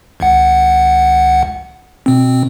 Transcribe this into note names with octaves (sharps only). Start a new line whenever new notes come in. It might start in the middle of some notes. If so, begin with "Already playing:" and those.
G#1 C#2 F#5
B2 C4